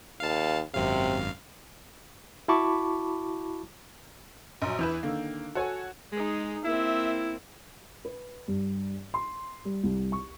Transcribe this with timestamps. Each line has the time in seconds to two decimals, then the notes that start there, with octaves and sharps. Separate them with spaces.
0.20 D#2 F5 A5
0.74 G#1 F#2 C3 F5
2.48 E4 F#4 A5 B5 C#6 D6
4.62 A#1 F#3 D#5 A#5 C6
4.79 E2 E3 E4 B4 G6 E7
5.03 D3 D#3 A#3 E6
5.55 F#4 A4 C#5 G#5
6.12 G#3 D#4 G#4
6.65 A#3 C4 E4 E5
8.05 B4
8.48 G2
9.14 C6
9.65 G3
9.84 C2
10.12 C#6